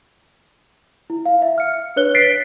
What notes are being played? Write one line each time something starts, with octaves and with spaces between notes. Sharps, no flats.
E4
F5
E5
F6 C#7
D4 B4 C#5 F#6 G7
A6 B6 C7 D7